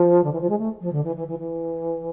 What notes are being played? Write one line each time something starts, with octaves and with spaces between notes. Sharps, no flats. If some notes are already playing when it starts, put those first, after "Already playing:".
Already playing: F3
D3
E3
F3
G#3
A3
F3
D3
E3
E3
E3
E3